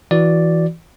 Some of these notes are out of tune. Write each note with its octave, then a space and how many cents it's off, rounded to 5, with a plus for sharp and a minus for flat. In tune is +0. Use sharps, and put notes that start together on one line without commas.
E3 +0 F#4 +0 D5 +0